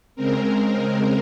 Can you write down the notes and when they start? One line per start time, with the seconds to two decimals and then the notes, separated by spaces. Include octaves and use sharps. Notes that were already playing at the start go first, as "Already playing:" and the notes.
0.16 C#3 G#3 C4 A#4